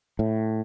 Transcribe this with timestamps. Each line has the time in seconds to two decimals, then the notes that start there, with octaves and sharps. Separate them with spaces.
0.19 A2